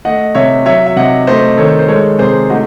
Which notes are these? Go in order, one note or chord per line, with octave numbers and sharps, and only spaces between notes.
A3 D#5 F#5
C3 C#5 E5
F#3 C#5 E5
E5
C3 D#5 F#5
A3 C5 D#5
D#3 A4 C#5
C5
G#3 A4 C#5
C3 G#4 C5
A3 D#4 F#4